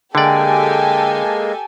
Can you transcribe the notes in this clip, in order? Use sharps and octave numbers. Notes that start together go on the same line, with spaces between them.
D3 G#3 A#3 G4 A4 D5 G5 G#5